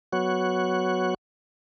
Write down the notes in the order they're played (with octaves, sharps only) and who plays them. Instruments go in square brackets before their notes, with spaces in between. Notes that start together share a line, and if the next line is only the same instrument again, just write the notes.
[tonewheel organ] F#3 B3 F#4 C#5 F#6